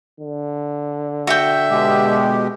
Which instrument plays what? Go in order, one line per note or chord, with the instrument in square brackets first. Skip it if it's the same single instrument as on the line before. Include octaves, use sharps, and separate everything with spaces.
[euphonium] D3
[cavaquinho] F#4 G5 [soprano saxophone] E5
[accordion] B2 G#3 G4